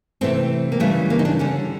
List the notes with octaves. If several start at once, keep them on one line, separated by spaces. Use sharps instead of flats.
C3 E3 A3 C4
A#3
C#3 E3 G3 A3
A#3
D#4
D4
D3 G3 C#4